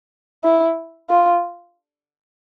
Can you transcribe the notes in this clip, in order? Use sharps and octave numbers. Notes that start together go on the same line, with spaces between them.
E4
F4